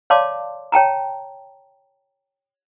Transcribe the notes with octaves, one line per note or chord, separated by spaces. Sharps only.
C#5 D5 F5 A5 C6 D6
C#5 G5 A5 A#5